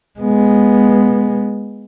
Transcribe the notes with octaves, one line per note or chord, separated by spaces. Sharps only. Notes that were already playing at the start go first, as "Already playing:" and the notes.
G#3 B3